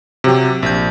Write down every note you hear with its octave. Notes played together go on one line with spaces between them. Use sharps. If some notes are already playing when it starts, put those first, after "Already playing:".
C3 F#3 G4
A#1 G6